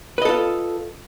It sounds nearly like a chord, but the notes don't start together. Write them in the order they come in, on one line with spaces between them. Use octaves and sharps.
B4 D#5 A4 F4